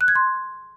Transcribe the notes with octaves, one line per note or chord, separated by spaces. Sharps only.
F#6
G#6
C6